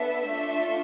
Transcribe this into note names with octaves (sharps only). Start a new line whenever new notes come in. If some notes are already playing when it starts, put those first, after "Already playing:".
Already playing: B3 D4 A4 E5
A3 D4 F4 A4